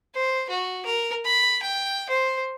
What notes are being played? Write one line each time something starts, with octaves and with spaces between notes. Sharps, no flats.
C5
F#4
A#4
B5
G5
C5